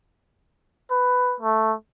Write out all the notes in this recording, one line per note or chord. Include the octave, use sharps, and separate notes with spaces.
B4
A3